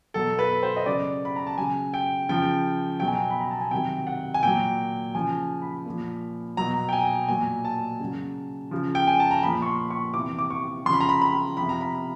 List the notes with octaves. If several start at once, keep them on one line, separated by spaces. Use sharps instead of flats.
B2 F#3 A4
B4
C5
D#5
C#3 F#3 D5
B5
A#5
A5
C#3 F#3 G#5
G5
C#3 F3 G5
B2 F#3 G5
G#5
G5
B5
A#5
A5
G#5
C3 D#3 F#3 G5
F#5
G#5
A#2 F#3 G5
C#3 F3 G#5
B5
A#2 F3
B2 F#3 A#5
G5
G#5
A#2 F#3 G#5
A5
C#3 F#3
C#3 F3
G5
G#5
A5
A#5
A#2 F3 B5
C#6
C6
C#6
C3 E3 D6
D6
C#6
C#3 F3 B5 C6
A#5
B5
B5
C3 F3 B5
A#5
B5